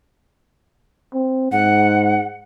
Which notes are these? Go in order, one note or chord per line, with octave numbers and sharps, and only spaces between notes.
C4
G#2 F#5